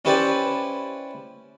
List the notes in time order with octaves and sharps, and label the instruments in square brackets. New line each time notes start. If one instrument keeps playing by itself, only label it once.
[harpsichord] C#4 E4 G4 B4 C5 D5